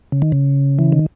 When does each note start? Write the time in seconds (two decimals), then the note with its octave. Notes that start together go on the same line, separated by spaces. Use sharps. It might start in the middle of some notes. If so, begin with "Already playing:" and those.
0.12 C#3
0.22 D#3
0.32 C#3
0.79 E3
0.92 D#3